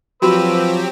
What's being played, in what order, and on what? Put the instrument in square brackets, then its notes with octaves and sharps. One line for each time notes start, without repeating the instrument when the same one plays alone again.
[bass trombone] F3 [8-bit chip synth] F#3 C4 G4 [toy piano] F#4 [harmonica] B4 B5 E6